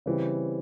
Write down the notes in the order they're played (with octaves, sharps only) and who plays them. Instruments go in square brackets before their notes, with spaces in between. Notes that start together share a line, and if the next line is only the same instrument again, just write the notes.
[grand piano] C#3 E3 G3 C4